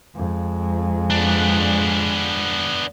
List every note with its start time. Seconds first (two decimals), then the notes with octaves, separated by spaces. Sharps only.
0.16 F2 G#3
1.10 B3 D4